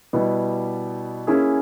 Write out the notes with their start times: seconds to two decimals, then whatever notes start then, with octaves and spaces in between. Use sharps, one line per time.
0.13 B2 G3 B3 E4 G4
1.27 A#3 C#4 E4 G#4